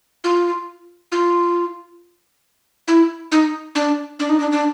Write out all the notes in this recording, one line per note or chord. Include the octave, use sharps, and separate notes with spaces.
F4
F4
E4
D#4
D4
D4
D#4
D4
D4